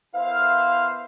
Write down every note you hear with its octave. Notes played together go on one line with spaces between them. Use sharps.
B3 E4 A#4 C5 F5